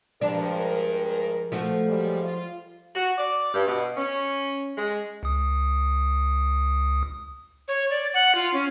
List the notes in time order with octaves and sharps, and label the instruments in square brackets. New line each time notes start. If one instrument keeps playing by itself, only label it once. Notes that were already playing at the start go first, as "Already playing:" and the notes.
[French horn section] G2 G#3 A#4 [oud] F3 D4
[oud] F3 A3 F#4
[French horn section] F#2 G3 G#3
F4
[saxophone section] F#4
D5
G2
B2
C#4
G#3
[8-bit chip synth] C#2 D#6
[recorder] C#5
D5
F#5
F4
C#4